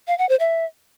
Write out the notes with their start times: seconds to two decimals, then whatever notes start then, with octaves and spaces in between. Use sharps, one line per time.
0.08 F5
0.18 F#5
0.29 C5
0.40 E5